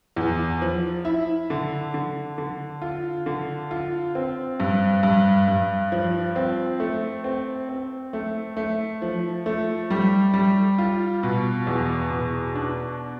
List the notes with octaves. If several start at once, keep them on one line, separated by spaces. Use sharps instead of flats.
E2
F3
E4
D3
D3
D3
F4
D3
F4
C4
G2
G2
G2
F3
C4
A3
C4
C4
A3
A3
F3
A3
G3
G3
F4
B2
E2
B2
D4